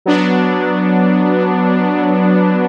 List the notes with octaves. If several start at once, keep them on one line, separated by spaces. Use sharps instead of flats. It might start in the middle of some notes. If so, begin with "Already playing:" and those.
F#3 B3 D4